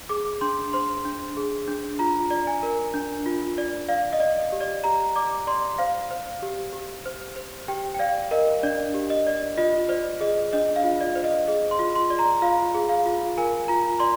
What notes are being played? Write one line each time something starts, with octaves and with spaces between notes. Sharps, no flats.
G#4 D6
D4 C6
C5 C6
D4
G#4
D4
F4 A#5
D5
G#5
A#4
D4
F4
D5
D5 F5
D#5
D5
D#5
G4
D5
G4 A#5
D5 D6
D5 C6
C5 F5
C5
G4
G4
C5
C5
G4 G5
G5
D5 F5
A#4 D#5
D4 D5
G4
D#5
D5
F4 D#5
C5 D5
G#4 D#5
D4 D#5
F5
F4
D5
C5
D#5
G#4 D#5
C6
F4
C6
D5
A#5
F4 F5
G#4
F5
F4
A#4 G#5
F4 A#5
D5 C6